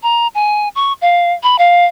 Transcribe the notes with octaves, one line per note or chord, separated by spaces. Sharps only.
A#5
G#5
C#6
F5
B5
F5